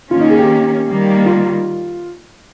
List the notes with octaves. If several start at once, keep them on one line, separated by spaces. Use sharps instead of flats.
D#3 A#3 C#4 F4
D#4
G#4
G4
D#3 G3 A#3
F4